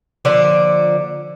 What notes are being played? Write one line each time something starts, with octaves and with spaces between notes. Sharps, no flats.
D3 F3 A#3 D5